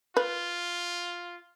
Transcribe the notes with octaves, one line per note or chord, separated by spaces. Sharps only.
F4 B4